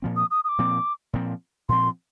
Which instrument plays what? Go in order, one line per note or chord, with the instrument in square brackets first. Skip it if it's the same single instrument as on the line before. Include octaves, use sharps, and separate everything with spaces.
[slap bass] A#2 F3 C4
[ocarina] D#6
D#6
D#6
D6
[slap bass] A#2 F3 C4
A#2 F3 C4
[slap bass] A#2 F3 C4 [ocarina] C6